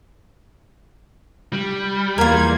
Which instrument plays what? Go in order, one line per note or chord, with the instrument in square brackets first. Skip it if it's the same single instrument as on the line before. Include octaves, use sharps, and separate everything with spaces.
[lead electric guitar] G3
[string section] E2 A#3 G#6 [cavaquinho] F4 A#4